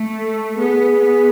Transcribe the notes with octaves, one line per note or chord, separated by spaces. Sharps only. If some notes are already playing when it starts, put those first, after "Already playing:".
Already playing: A3
A4
B3 G#4
B3